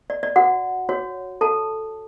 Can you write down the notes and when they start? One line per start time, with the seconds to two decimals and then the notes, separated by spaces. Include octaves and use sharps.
0.10 D5
0.23 D5
0.36 F#4 F#5
0.89 F#4 C#5
1.41 A4 A5